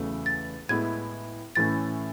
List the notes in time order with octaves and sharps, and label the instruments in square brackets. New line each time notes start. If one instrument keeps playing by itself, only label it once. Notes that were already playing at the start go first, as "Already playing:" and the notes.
Already playing: [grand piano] E2 C#3 F#3 A3
[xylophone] A6
[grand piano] A2 G#3 B3 E4 G#4 [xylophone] G#6
[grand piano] A2 E3 A3 C#4 [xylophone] A6